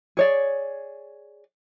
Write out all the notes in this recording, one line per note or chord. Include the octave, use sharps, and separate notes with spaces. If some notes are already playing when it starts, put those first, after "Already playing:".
G#4 C#5 D5